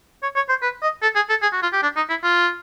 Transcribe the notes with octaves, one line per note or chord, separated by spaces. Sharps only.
C#5
C#5
C5
B4
D#5
A4
G#4
A4
G#4
F#4
F4
G4
D4
D#4
E4
F4